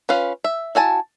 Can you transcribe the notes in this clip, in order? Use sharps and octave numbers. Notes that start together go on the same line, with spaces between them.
C#4 F4 B4 F5
E5
E4 F#4 G#5 A5